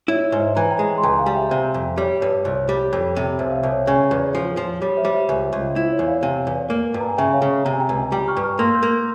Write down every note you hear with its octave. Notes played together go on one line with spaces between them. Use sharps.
E4 C#5
C#5
G#2
C5 E5
E3 A#5
G#5
G5 A#5
G#3
C6
C#2 G5 A#5
F5 G#5
G3
E5 G5
C3 C5 E5
F2
G3 C#5
G2 C#5
C2 C5
C#5
C5
G3
F2 C#5
C3
C2 C5 E5
F5
C5 E5
C2
C#5
C#3 C#5
E2
F3
F3
G3 C#5
C5 E5
G3
C5 E5
C#2 C5 E5
C#2
E4 C5
C#5
E2
C#5 F5
C3 F5 G#5
E2
A#3
G2
A#5
G#5
C#3 E5 G5
C#5 F5
C#3
C3 A#5
G#5
G5 A#5
C#2
G3 G5 A#5
C#6 F6
G2
C#6 F6
A#3 C6 E6
E6 G6
A#3